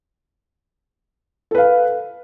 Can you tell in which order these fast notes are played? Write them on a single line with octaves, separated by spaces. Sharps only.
A4 B4 F5